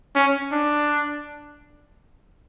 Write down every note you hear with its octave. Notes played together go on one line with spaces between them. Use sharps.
C#4
D4